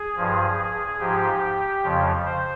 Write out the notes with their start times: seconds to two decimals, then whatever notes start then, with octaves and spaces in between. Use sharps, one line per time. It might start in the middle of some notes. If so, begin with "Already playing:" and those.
Already playing: G#4
0.16 G2 F3
0.99 G#2 F3 G4
1.83 F2 C#3 F3
2.25 C5